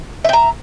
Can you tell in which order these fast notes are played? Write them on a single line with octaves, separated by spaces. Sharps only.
E5 G5 A#5